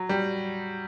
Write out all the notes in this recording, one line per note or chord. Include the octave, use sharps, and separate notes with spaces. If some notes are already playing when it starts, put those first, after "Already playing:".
Already playing: F#3
G3